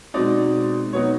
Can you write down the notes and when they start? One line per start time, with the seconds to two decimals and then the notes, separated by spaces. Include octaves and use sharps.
0.14 B2 G#3 C4 D#4 D5
0.93 B2 F#3 B3 D#4 C#5